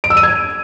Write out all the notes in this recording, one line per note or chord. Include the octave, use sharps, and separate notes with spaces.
D7
E6
D#7
G#6